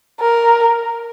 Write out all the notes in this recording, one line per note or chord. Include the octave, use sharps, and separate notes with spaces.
A#4